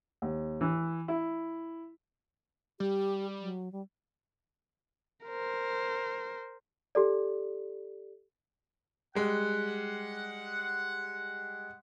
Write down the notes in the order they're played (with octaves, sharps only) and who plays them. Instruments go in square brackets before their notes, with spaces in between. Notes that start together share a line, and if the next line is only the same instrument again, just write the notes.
[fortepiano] D#2
E3
E4
[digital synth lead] G3 [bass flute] G4
[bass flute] F#3
G3
[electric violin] A#4 C5
[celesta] G4 A4 D5
[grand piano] G3 G#3 [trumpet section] F#5